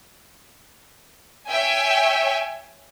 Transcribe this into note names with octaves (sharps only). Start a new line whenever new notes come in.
C#5 E5 G5 G#5